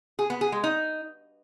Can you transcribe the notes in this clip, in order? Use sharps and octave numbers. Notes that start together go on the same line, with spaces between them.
G#4
B3
G#4
G#3
D#4